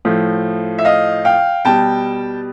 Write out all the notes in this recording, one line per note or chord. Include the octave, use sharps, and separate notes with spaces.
A2 F3 A3
E5
D#5 F5
F5 G5
B2 G3 G5 A5